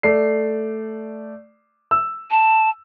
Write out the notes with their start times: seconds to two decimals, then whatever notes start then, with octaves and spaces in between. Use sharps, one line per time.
0.03 A3 D5 C7
1.91 E6
2.31 A5